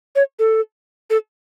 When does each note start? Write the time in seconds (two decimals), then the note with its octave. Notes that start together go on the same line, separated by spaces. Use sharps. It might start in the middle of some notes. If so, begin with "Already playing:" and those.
0.16 C#5
0.39 A4
1.10 A4